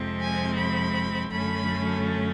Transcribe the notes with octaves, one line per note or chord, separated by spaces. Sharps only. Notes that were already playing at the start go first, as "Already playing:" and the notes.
Already playing: F2 C3 F3 G#3 C4
G#5
B5
F#2 D3 F#3 A3 C#4 B5